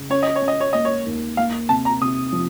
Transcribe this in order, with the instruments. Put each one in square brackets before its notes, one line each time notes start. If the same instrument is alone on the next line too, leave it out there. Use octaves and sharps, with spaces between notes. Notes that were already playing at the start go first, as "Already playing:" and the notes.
Already playing: [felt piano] C#3
[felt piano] C#4 [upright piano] C#5
[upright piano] D#5
C#5
[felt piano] C#4
[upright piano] D#5
C#5
[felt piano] A#3 [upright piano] D#5
[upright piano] C#5
[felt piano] D#2
[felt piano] A#3 [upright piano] F5
[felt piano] C3 [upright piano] A5
[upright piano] A#5
[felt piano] C3 [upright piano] D#6
[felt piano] F3